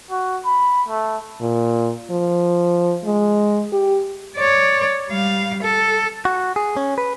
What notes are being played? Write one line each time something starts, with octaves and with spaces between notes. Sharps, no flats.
F#4
B5
A3
A#2
F3
G#3
G4
C#5 D5
G3 F5
A4
F#4
G#4
C#4
B4